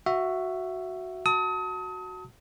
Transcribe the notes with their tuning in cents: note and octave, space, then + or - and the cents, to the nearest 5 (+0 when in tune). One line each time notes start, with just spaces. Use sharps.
F#4 +0 E5 +15
F#4 +0 A5 +20 D#6 +35